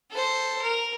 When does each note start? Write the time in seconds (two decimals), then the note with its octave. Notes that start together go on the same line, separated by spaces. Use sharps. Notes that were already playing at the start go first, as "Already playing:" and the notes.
0.11 A4 C5
0.61 A#4